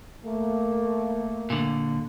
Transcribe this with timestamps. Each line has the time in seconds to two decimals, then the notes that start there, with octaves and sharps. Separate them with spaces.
0.24 A3 A#3
1.50 A#2 D3